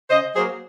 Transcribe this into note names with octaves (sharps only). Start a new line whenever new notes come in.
C#3 C5 D#5
F#3 A#3 G#4 C5